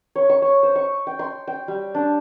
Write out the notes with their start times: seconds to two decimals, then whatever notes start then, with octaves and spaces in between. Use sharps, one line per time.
0.16 C#5
0.29 C#6
0.42 C#5
0.63 C5
0.76 C#6
1.07 G5
1.19 C6
1.47 G5
1.68 G3
1.95 D4